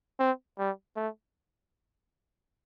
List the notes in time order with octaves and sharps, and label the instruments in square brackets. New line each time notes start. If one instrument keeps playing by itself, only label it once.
[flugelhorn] C4
G3
A3